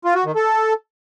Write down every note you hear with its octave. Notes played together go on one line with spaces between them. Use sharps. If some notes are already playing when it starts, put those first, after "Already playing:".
F4
F#4
D#3
A4